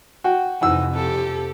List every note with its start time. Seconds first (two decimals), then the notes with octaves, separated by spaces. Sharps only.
0.24 F#4 G5
0.61 F2 C3 E3 D#4 F#5 E6
0.95 G4 A4